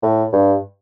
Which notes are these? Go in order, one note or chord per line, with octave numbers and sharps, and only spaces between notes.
A2
G2